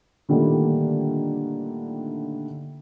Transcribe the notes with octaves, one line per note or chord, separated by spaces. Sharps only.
A#2 D3 D#3 G3 A3 A#3